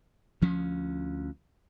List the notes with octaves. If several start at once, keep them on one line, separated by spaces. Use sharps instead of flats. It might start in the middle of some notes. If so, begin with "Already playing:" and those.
D2 F3 C#4